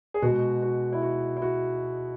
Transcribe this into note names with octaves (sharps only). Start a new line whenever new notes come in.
G#4
B2 G#3 F#4
F#4
E4
F#4
E4
F#4